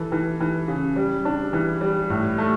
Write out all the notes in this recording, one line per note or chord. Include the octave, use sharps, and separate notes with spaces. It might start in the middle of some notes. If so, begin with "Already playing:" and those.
Already playing: E3 A4
E3
E3
C#3
G3
D4
E3
G3
A2
A3